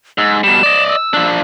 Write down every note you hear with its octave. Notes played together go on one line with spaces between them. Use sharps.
G#2 E6
B2 G3 E7
D5 D#5
E6
F3 D4